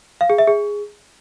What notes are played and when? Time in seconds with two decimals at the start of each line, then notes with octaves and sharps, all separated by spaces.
0.21 F5
0.30 G#4
0.38 E5
0.47 G#4